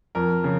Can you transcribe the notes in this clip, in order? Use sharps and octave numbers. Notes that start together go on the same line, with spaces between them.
F2 A#4
C#3